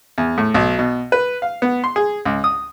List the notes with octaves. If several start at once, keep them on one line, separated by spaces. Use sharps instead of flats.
E2
A2
B1
B2
B4
F5
B3
C6
G#4
C#2
D#6